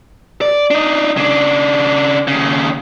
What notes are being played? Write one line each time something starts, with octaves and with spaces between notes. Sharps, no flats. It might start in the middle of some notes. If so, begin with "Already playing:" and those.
D5
D4 D#4
C#3 D4
D#2 C#3